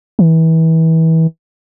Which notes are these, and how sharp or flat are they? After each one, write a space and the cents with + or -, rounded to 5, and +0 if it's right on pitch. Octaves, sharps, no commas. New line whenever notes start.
E3 -30